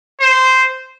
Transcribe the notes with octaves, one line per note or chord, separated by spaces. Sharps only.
C5